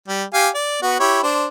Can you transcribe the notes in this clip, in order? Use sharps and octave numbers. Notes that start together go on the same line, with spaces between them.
G3
G4 F5 G#5
D5
B3 F#4
E4 G4 C#5
D4 C5